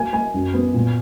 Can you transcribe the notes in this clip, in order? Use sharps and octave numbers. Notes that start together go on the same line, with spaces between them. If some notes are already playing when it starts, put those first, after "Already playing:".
Already playing: F#3 A#3 G#5
A#3 G#5
F#2
B3
A#2